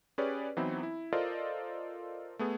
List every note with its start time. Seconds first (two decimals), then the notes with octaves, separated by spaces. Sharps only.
0.18 C#4 G4 G#4 B4 C#5 D5
0.57 E3 F#3 B3 C4 D#4 E4
0.83 E4
1.13 F4 A4 A#4 C5 D5 D#5
2.39 A3 B3 G#4